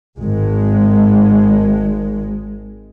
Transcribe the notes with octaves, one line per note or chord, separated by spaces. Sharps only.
G#1 G#3